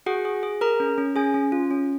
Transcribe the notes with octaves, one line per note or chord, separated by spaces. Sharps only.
F#4 G#4 F#5
G#4
G#4
G#4 A#4 A#5
C#4
C#4
C#4 G#4 G#5
C#4
F4
C#4